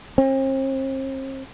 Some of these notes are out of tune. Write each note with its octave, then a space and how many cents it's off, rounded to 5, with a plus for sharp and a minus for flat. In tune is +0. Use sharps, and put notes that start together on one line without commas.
C4 +40